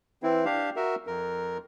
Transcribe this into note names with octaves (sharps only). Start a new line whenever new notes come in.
E3 C4 E4
D4 G4 F5
F#4 A#4 E5
F2 A#4